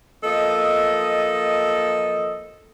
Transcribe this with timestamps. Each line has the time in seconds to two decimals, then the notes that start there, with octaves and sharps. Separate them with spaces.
0.24 F3 A#3 A4 D#5